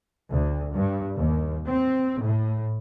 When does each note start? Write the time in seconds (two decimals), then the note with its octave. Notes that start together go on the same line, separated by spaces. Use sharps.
0.31 D2
0.74 G2
1.16 D#2
1.64 C4
2.22 A2